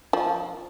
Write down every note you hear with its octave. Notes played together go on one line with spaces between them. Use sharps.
F3